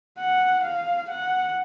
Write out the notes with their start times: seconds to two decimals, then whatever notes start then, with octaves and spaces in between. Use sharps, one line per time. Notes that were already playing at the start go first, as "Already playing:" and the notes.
0.18 F#5
0.65 F5
1.10 F#5